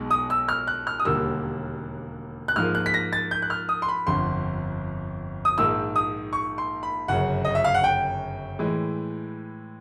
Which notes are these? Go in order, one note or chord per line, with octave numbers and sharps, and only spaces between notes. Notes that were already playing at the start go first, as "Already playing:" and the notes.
Already playing: B1 B2 G#3
D#6
E6
F6
F#6
F6
D#6
E1 D#2 D3 G3 A#3 E6
F#6
G#2 F3 A#3 F6
F#6
B6
A#6
A6
G6
F#6
F6
D#6
C6
B5
G1 F2 D3 C6
D#6
A#1 G#2 D#3 E6
D#6
C#6
C6
B5
G1 F#2 C#3 F#5
D#5
E5
F5
F#5
G5
A2 E3 G#3